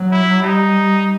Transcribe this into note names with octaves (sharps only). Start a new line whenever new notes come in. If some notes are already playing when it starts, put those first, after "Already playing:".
Already playing: F#3
E4
G3 D#4